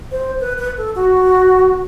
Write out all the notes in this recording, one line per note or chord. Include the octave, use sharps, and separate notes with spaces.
C5
B4
B4
A4
F#4